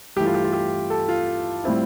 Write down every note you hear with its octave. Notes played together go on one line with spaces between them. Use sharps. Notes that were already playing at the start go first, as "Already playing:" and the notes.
G2 E3 A3 E4 G4
F4
G4
F4
G4
A4
F4
A2 G3 C4 E4